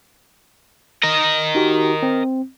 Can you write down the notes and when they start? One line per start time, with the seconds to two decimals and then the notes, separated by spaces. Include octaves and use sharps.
1.03 A#4 D#5
1.55 D#4 F#4 G4
2.03 C4